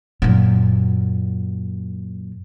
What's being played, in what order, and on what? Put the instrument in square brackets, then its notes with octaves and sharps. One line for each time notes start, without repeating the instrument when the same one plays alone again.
[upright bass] F#2 A#2